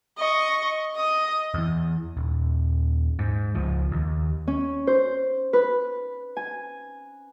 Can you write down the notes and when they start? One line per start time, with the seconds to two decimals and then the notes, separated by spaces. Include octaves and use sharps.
0.17 D#5 C#6
0.96 D#5 D#6
1.54 E2 E3
2.17 D#1
3.19 G#2
3.55 C#2 F3
3.92 D#2
4.47 C#4
4.87 C5
5.53 B4
6.37 G#5